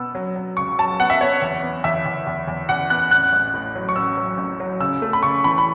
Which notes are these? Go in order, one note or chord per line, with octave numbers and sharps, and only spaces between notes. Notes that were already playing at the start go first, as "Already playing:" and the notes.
Already playing: B2 B3 E6
F#3
F#3
C#2 C#6
F#3 A5
B3 F#5
E5
B3 C#5
E2
B3
E2 E5
E2
E2
E2
E2 F#5
B3 F#6
A1 F#6
A1
A2
F#3
C#6
C#4 E6
F#3
A1
F#3
C#3 E6
A3
B5
C#3 C#6
E3 B5
B5